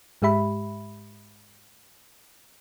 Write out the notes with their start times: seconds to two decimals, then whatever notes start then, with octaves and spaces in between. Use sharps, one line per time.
0.22 G#2 G#3 G4 E5 B5